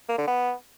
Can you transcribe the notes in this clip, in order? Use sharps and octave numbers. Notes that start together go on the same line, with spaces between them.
A#3
D3
B3